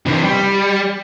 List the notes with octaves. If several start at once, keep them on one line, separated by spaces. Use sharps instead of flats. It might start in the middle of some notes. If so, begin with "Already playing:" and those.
C3 E3
G3